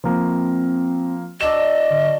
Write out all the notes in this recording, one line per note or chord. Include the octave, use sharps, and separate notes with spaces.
F3 A#3 C4
F#3 D4 D5 D#5 E6 E7
D3